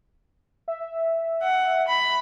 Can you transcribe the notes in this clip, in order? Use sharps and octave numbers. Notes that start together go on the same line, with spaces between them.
E5
F#5
B5